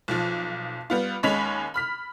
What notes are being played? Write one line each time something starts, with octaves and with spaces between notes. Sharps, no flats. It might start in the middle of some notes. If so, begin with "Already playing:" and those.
B1 F3
G3 B3 F4
D#2 G#3 C#4 B5 B6 F7
B5 F6 B6